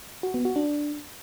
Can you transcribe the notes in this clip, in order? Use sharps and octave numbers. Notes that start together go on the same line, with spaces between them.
F#4
B3
F#4
D4